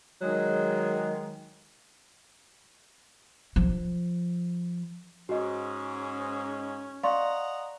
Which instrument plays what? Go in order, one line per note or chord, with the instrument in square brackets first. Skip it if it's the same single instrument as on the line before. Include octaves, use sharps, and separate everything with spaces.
[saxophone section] D#3 G#3 [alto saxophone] F#3
[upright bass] F3
[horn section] G#2 [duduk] C#4 [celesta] F#4 D#5
[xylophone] D5 [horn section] D#5 F#5 A#5 [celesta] F5 C6 C#6